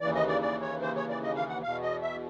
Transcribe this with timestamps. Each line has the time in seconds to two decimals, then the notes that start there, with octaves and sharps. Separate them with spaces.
0.01 D#2 C#3 E3 D5
0.15 D#5
0.28 D5
0.42 D5
0.61 C#5
0.82 C5
0.96 C#5
1.09 D5
1.23 D#5
1.36 F5
1.48 F#5
1.63 E2 B2 F5
1.82 D#5
2.02 E5